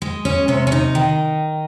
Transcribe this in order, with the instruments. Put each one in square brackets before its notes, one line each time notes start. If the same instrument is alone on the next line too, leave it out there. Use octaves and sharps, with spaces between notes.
[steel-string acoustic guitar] G#3
C#4
C3 C#4
C#4
D#4
D#3